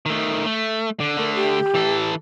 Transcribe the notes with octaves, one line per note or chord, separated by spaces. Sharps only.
D#3 A3
A3
D3
D3 A3 A#4
G4
E3 A4